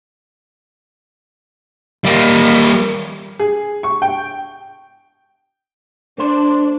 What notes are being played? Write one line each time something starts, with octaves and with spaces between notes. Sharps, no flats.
G3 A#3
G#4
C#6
G5
A3 D4 C5